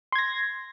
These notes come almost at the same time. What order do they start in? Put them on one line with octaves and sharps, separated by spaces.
C6 G#6 A#6